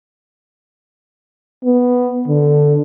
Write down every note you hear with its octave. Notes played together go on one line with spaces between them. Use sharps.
B3
D3